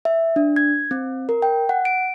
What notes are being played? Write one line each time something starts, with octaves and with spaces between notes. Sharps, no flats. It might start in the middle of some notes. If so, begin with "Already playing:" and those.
E5
D4
G#6
C4
A#4
G5
F#5
D7